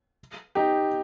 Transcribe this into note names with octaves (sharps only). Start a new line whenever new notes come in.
D#4 G4